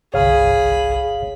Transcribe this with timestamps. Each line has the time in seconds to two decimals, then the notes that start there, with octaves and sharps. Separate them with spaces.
0.14 G1 C2 G#4 C#5 F5 B5